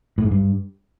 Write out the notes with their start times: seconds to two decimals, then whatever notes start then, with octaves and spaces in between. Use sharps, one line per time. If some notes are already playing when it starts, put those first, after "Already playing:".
0.18 A2
0.25 G#2
0.31 G2